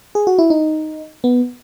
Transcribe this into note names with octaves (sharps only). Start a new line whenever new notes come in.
G#4
F#4
E4
D#4
B3